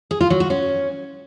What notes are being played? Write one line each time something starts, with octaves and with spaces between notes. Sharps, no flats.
G#4
F4
F#3
F#4
C#4